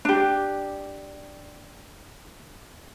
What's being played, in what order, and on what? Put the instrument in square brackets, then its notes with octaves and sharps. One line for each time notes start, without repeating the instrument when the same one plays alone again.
[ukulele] D4 G4